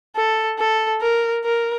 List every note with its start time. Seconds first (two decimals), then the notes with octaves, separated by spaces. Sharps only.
0.16 A4
0.59 A4
1.01 A#4
1.44 A#4